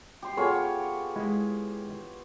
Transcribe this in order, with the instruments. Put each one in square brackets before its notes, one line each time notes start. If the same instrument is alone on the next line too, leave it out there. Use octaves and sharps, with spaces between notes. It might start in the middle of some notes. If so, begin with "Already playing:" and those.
[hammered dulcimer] G4 C6
[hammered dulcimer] B3 F4 C#5 [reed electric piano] G#4 A4 G#5
[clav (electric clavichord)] G#3 E4